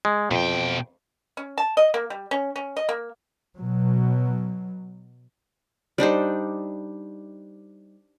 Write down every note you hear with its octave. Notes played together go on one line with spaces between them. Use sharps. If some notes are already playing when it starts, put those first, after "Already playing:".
G#3
F2 B2 G5
C#4
A5
D#5
A#3
G3
C#4
C#4
D#5
A#3
B2 F#3
G3 D4 D#4 C5